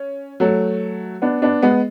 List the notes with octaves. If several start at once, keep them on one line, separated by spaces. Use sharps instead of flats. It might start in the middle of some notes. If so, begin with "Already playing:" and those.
Already playing: C#4
F#3 A3
B3 D4
B3 D4
G#3 B3